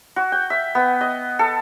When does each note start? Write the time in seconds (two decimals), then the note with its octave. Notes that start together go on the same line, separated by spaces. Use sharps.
0.16 F#4
0.32 G5
0.50 E5
0.75 B3
1.01 D#5
1.39 A4